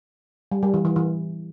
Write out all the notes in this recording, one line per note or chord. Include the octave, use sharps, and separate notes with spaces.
G3
G3
E3
E3
E3